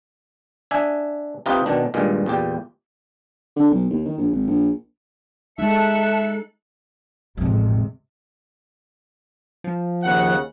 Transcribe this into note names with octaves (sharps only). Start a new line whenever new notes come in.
D4 E5 G#5
C3 D#4 F4 G4 B4 D#5
B2 D#3 D4
G2 A#2 D#3 G#3
E2 A#2 G4
D3
B1
D#2
D#3
A#1
G#1
A#1
G#3 D#4 A4 E5 A5 F#6 C#7
A1 F2 G#2 C3
F3
D#2 C#3 F#5